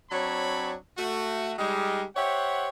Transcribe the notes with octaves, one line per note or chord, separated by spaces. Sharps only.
F#3 C4 D4 C#5 A5 B5
A3 F#4
G3 G#3 D#4
G4 C5 C#5 E5 F#5